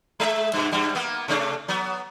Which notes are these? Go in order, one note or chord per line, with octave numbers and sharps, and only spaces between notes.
G#3 D#5 E5
G2 B2
G2 G3
A#3 B3
C3 A3 D4
F#3 B3